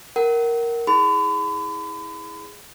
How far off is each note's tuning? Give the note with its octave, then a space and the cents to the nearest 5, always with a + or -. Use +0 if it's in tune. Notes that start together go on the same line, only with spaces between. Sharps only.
A#4 +0 F#5 +35
E4 -25 G#4 +0 B5 +40